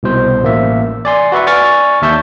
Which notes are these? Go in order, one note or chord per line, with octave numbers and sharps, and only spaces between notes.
C2 B2 C5
A1 A#3 E5
D5 G#5 C6
F#4 B4 E5 C#6
D5 G#5 C#6 D6 F6 A6
D#2 E5 A5 C#6 G6